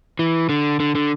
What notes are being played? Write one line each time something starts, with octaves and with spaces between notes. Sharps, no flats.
E3
D3
D3
D3